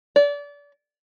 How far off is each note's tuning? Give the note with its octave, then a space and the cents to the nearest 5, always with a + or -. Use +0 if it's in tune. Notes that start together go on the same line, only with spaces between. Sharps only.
D5 -30